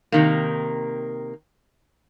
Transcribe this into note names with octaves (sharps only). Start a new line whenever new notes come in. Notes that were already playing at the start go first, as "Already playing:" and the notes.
C3 D#3 A#3